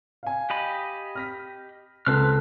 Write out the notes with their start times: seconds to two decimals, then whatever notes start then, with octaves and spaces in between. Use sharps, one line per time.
0.23 F5 G#5
0.50 G4 D#5 B5
1.15 F6 A#6 B6
2.06 C#2 C4 A4 B4 F6